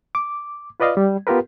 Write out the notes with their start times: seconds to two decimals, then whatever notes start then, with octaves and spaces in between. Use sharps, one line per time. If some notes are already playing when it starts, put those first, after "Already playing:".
0.15 D6
0.80 F4 B4 D5 D#5 F5
0.97 G3
1.27 B3 F4 G4 A#4 B4